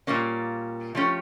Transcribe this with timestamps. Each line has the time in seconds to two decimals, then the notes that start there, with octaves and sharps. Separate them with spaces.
0.07 A#2 G3 A#3 C#4
0.95 F3 A3 C#4 G4